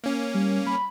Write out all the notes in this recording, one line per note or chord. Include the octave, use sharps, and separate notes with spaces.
A#3 C#4
G3
B5